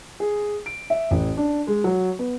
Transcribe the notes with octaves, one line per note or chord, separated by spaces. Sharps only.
G#4
D7
E5
A1
D4
G#3
F#3
B3